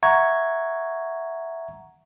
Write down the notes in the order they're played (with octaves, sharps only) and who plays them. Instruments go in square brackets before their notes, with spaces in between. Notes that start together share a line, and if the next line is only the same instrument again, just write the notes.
[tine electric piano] E5 F#5 A#5 C#6 G#6